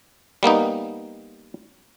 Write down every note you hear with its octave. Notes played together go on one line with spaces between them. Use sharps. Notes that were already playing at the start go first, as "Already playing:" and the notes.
G3 A#3 B3 D#4